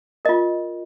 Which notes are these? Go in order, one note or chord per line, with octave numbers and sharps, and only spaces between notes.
F4 A#4 D#5